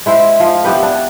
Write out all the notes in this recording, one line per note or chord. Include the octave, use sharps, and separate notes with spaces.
G#3 E4 C5
F3
B3 E4 G4 B4
D4